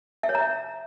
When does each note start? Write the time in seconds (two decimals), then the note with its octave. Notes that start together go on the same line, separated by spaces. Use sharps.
0.23 E5
0.29 C#5
0.35 A#5
0.40 E5